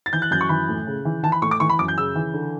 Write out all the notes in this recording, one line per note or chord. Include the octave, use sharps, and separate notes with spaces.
A6
E3 G6
F#6
F#2 G6
C#6
E3 B5
A2
C#3
E3
E3 A5
B5
A2 C#6
D6
E3 C#6
B5
F#2 D6
G6
C#3 E6
E3
D3